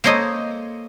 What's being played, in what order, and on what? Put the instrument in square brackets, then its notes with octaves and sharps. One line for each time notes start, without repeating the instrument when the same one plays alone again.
[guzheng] A#3 A4 C5 C#5 D#5